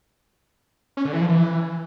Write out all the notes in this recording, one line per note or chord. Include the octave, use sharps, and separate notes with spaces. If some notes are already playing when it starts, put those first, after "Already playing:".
C#4
D3
E3
F3
E3